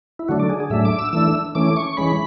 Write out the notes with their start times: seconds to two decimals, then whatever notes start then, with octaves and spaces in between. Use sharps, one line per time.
0.19 E4
0.28 D3 F#3 A3 D4 F#4
0.40 D5
0.50 G#4
0.60 G#4
0.70 A2 F#3 A3 D4 E5
0.85 D6
0.99 E6
1.13 E3 A3 D4 E6
1.55 E3 A3 C#4 D6
1.76 C#6
1.97 E3 G#3 C#4 B5